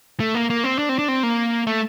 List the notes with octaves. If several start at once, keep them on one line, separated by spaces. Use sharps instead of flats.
A3
A#3
A#3
C4
D4
C4
D4
C4
A#3
A3